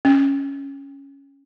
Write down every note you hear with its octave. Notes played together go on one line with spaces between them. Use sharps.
C#4